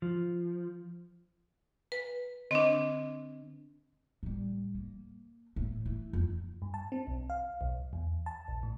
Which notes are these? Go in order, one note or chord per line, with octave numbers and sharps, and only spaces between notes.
F3
B4
D3 C4 D4 D#5
A2 G3
A#3
A2
E3
F2 D#3
G2
A5
C4
B1
F5
B1
E2
A5
A#1
A2